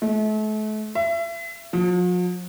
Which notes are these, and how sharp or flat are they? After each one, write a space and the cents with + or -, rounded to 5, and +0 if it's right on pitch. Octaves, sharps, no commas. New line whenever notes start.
A3 -40
E5 +35
F3 +45